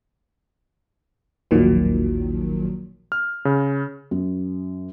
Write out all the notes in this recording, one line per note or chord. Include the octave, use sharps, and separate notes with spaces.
A1 D#2 A#2 D#3 F3 F#3
F6
C#3
F#2